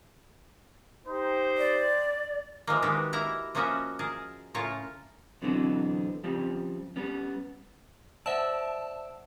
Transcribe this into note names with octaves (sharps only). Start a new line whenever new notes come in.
D#4 G4 C5
D5
E3 F3 G#3 A#3
D#3 G#3 B3 F#4 G4
A#3 E4 A#5
F3 A#3 C#4 F#4 D#5 E5
G#4 A#4 A5
A2 C#3 F4 A#4 C#5 A5
B2 D3 E3 F#3 B3 C4
C#3 F3 G3 C4 G4
G3 B3 C#4
C5 D5 E5 F#5 A5 E6